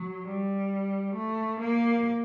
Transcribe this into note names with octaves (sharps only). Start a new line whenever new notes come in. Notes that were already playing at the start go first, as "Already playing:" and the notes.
Already playing: F#3
G3
A3
A#3